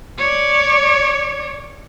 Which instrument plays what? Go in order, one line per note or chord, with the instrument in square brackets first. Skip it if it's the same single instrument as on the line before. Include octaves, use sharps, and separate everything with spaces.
[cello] C#5 D5